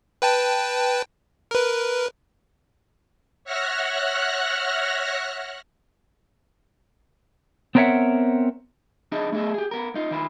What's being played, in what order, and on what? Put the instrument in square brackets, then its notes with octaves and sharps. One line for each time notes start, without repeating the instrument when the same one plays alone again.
[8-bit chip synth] B4 G5 A5
A#4 B4
[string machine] C#5 E5 F#5 F6 F#6 A#6
[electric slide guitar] B3 C4 A#4 C#5 E5 F#5
[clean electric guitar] D4 D#4 G#4 D#5 E5
A3 B3 G#4 D#5 E5
G4 G#4
B3 A#4
D#4 F4
D#3 E4 F4